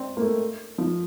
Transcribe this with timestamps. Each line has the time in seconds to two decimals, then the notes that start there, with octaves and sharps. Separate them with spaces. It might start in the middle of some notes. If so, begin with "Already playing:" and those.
Already playing: C4 D4
0.17 A#3
0.21 A3
0.78 F3